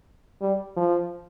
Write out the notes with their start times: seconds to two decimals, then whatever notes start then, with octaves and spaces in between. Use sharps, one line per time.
0.42 G3
0.77 F3